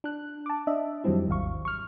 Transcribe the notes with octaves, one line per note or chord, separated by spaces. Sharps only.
D4 F#6
A5 D6
D4 D#5 E5
F2 D#3 F#3 G3 C4 E4
G#1 D#2 F5 C#6
C#6 F6